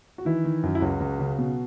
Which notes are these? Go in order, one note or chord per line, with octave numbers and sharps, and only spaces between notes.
F#4
D#3 E3 E4
D#3
F#2
E4
C#2 F#3 F#4
C#2
C#3
B2